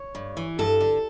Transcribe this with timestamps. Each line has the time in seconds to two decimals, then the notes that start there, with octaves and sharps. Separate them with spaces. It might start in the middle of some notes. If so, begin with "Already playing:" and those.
Already playing: C#5
0.15 G2
0.37 E3
0.59 G2 A4
0.81 D3